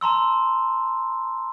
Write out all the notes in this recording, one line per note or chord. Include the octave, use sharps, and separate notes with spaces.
A5 A#5 C6 E6